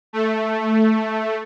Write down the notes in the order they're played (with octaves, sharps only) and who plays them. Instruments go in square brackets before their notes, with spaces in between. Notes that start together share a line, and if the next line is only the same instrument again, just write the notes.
[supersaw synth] A3